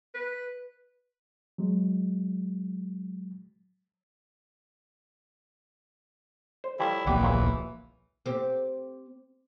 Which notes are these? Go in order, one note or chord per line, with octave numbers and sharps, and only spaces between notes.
B4
F#3 G#3
C5
A2 F3 G3 E4
D1 A#1 E3 A#3 G4 D5 F#5
A#2 F#3 G#3
C4 G4